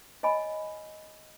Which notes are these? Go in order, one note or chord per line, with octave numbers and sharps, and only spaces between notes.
C#5 D#5 G#5 B5